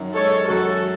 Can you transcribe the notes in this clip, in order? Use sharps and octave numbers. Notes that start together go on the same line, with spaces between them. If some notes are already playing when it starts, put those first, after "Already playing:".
Already playing: F#2 D#3
G#3 A4 C#5
F#2 F#4 A4